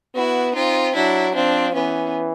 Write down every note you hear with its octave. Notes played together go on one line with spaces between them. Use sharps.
B3 E4 F#4
C4 D#4 F4
F#3 D4 E4
F3 C4 D4
E3 B3 C#4